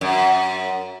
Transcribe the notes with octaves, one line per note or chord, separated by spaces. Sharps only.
F#2